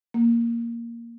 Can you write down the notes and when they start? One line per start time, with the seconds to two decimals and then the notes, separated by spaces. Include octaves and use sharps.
0.14 A#3